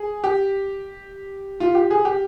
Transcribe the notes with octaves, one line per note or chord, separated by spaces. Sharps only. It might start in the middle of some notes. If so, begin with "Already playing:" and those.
Already playing: G#4
G4
F4
G4
G#4
G4